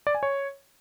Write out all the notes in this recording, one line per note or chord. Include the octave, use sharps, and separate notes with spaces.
D5
G#5
C#5